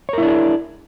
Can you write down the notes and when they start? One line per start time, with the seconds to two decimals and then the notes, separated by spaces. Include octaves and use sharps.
0.09 C#5
0.13 A#4
0.18 E4
0.22 D4
0.27 G#4